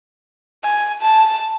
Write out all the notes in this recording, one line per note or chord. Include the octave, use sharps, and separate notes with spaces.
G#5
A5